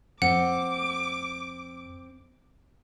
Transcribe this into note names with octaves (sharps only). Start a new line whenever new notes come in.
F2 C4 F#5 D6